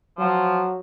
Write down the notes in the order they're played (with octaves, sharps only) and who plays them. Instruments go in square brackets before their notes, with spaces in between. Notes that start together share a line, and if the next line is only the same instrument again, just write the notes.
[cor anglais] F3 [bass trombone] F#3